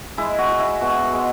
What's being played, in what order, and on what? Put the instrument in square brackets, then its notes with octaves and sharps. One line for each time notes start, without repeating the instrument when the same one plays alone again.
[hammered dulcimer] G#3 E4
F#4
E4
E4
B2 F#4
G#3